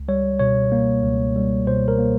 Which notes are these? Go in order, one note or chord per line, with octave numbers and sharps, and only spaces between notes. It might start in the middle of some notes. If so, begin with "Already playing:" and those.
Already playing: C#2
G3 C#5
B2 C#5
A#3
C#2
G3
B2 C5
A#4
A#3